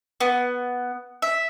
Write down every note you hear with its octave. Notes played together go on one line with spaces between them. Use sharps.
B3
E5